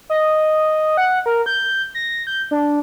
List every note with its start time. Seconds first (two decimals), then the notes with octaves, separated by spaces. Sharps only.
0.10 D#5
0.97 F#5
1.26 A#4
1.46 G6
1.95 A#6
2.27 G6
2.51 D4